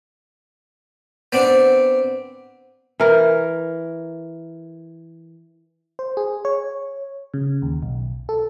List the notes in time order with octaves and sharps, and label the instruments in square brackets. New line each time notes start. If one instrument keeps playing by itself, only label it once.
[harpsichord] B3 C4 D4
[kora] E3 A#4
[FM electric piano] C5
G#4
C#5
C#3
D#2
B1
A4